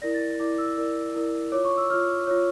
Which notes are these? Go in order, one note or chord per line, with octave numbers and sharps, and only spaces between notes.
E4 A#4 D5 A#6
A6
A6
E4 A#4 D5 D6
E6
E4 A#4 D5
E4 A#4 D5
F4 C#5 D6
C#6
E6
F4 C#5 F6
F4 C#5